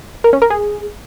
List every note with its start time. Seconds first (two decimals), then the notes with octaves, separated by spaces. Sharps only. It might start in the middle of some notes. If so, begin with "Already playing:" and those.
0.24 A#4
0.33 C#4
0.42 A#4
0.50 G#4